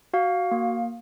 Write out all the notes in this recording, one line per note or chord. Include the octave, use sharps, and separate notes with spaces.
F#4 F5
A#3